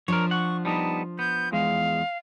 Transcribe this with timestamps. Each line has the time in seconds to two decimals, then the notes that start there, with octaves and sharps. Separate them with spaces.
0.08 F3 D4 A#4 C#5
0.31 F#5 C#6
0.65 G3 B3 D#4 A5
1.19 B3 G6
1.52 E2 G#3 F5